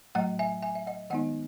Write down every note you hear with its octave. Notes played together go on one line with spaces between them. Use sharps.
A2 F#3 A3 D#5 F#5
E5 G#5
E5 G#5
E5
D#5 F#5
D#3 G#3 B3 D#4 D#5 F#5